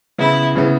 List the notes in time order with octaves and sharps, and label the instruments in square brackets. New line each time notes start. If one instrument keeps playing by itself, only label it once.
[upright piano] C#3 E3 B3 [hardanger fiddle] E4
[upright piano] C#3 E3 B3